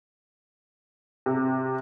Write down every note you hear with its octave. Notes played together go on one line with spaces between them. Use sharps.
C3